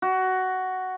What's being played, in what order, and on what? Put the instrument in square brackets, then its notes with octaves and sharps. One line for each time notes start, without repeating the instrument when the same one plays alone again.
[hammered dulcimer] F#4